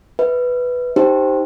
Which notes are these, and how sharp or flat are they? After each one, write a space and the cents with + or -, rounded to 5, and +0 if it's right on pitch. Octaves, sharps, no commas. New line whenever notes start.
B4 +0 E5 -30
D#4 +0 G4 +0 C5 +0